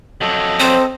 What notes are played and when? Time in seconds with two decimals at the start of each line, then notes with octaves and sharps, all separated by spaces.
0.21 F2 F#3 A4 D#5
0.60 C4 C5